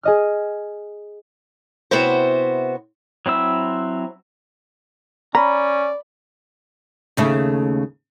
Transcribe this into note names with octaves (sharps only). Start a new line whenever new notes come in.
G#4 D#5 F6
C3 B3 E4 F#4 C5
F#3 C4 E4 E6
C#4 D5 A#5 B5
D#2 C#3 A3